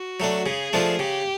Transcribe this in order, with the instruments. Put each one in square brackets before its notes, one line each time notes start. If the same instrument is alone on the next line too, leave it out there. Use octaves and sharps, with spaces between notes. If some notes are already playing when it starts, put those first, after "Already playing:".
Already playing: [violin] F#4
[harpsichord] F#3 A3 D4
[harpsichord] C#3 [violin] G#4
[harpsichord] F3 A3 D4 F4
[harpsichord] C#3 [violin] G4